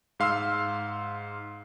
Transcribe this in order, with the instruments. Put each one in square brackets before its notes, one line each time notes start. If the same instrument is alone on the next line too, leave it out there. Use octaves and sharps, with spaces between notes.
[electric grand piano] G#2 F5 C6 E6